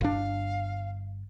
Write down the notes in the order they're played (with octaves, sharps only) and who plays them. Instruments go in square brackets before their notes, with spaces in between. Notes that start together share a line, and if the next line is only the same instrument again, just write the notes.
[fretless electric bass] G1 D4 [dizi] F5